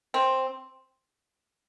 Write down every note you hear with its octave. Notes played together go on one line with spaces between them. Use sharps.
C4